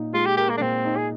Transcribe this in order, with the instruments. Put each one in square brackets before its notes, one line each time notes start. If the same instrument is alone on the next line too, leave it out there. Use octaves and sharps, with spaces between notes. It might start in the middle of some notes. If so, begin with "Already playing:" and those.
Already playing: [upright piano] A#2 D#4
[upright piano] G#3 [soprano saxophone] F4
[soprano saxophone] G4
[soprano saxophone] G4 [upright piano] A#4
[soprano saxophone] A#3
D4
[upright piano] A#2 [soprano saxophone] C4
[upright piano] D#4
[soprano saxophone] G#4